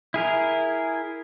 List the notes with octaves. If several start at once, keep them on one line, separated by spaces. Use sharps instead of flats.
E4 G#4 A#4